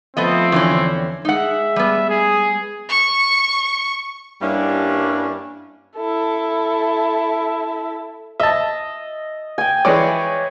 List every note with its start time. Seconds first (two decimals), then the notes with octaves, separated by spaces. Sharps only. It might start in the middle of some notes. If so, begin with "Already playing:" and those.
0.17 F3 A3 B3 C4 D#5
0.52 E2 D3 C#4
1.25 G#3 D#4 E5 F#5
1.76 G3 B3
2.10 G#4
2.89 C#6 C#7
4.42 G2 G3 A#3 C#4 D4 E4
5.96 E4 A4
8.40 D#5 E5 A5
9.58 G5 G#5
9.85 E3 G#3 C#5 D5